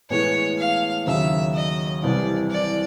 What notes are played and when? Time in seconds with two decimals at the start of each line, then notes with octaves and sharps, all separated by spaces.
0.10 A2 E3 G#3 B3 C#5
0.58 F5
1.07 D#2 C#3 F#3 E5
1.55 D#5
2.03 C2 C3 E3 G3 D5
2.51 D5